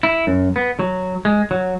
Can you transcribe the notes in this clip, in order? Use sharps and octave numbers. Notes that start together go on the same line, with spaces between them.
E4
F#2
B3
F#3
G#3
F#3